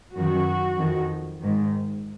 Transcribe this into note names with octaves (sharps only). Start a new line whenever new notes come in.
F#2 D#3 F#4
F2 D#3
G#2 D#3